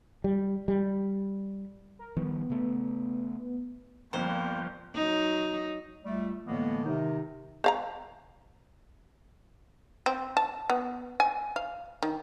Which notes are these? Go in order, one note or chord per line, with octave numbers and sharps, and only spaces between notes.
G3
G3
A#4
D#3 F3 G3 B3
C#3 A3
G1 G2 F3 A#3 C4 C5
F#3 D#4
C#2 G3 A3
A2 D3 E3 G#3 A#3 B3
C3 D#3 D#4
C5 F5 A#5
C4
A5
B3
G#5
F5
D#3